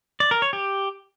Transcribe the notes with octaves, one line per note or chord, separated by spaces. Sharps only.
D5
A#4
C#5
G4